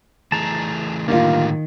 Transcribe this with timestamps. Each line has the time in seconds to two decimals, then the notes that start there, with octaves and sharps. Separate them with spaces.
0.32 E3 A3 G#4 A5 A#5
1.08 A2 D3 D#3 G3 A#3 F4